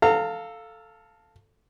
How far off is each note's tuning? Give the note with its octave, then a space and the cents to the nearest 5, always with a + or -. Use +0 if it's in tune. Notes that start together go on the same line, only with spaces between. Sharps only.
A4 +0 F5 +0 A#5 -30